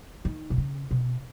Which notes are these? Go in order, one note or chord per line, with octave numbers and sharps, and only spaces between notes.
D#3
B2
C#3
B2